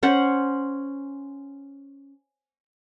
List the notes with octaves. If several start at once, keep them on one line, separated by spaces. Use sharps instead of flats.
C#4 C5 F#5